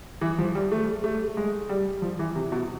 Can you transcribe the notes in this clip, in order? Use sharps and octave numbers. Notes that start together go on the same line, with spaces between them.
E3
F3
G3
A3
A3
G#3
G3
F3
E3
C3
B2